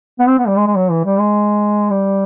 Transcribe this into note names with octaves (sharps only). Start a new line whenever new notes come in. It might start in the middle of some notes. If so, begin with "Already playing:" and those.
B3
C4
B3
G3
G#3
G#3
F#3
E3
G3
G#3
G3